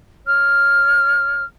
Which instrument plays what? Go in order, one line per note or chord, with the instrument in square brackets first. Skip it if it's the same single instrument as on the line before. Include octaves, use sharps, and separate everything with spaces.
[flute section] C#5 F6